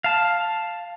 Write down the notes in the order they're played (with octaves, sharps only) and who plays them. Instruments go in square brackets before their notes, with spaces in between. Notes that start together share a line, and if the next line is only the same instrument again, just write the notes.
[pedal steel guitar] F5 A5